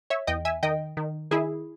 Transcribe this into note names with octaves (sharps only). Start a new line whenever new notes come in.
C#5 E5
E2 D#5 G5
E5 G#5
D#3 D#5 G5
D#3
D#3 E4 G#4